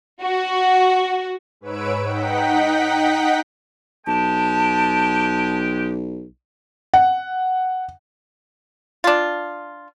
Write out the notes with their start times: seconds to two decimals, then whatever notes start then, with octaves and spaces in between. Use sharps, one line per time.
0.22 F#4
1.61 G#2 B4 C#5 E6 D7
2.03 D#4 F#5 G5 B6
4.07 B1 G#3 G4 G5 A5
6.94 F#5
9.04 D4 F4